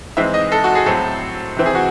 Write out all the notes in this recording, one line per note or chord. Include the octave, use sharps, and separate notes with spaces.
G#2 E3 G#3 C4 E5
D#5
A4
F#4
G#4
A2 F#3 C4 A4
C3 E3 C4
G#4
F#4